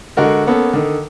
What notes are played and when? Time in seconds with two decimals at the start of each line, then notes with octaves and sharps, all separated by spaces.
0.17 D3 G#3 F#4 A#4
0.47 A#3 B3 C#4 A4
0.73 D3 D#3